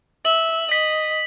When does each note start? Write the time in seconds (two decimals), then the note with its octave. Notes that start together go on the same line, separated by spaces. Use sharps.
0.25 E5 F#7
0.71 D#5 B6